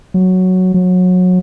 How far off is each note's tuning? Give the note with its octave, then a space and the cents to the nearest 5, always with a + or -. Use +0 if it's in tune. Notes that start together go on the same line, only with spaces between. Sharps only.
F#3 +0
F#3 -25